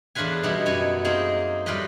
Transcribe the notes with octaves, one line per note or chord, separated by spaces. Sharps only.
E2 A2 D4 F4 B4 G#5
B2 G3 B3 D#4 E4
F#2 A4 C#5 G#5
A#3 C4 D#4 G#4
A2 G3 F4 G4 B4 D#5